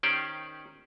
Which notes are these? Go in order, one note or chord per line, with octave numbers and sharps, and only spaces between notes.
D#3 C#4 G4 C5 D5